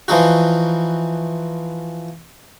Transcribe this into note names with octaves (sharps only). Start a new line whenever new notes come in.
E3 F3 D#4 F#4